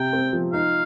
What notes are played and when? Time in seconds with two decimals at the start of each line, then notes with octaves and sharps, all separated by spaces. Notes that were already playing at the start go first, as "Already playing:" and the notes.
Already playing: C3 G5
0.13 C4
0.33 F3
0.53 D#4 F5